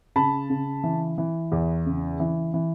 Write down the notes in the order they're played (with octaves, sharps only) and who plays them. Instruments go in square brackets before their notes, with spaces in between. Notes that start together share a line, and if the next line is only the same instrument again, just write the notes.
[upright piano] C#3 A5 B5
C#3
E3
E3
E2
C#3
E3
E3